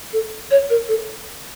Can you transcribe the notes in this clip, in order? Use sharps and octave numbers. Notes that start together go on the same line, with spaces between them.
A4
C#5
A#4
A4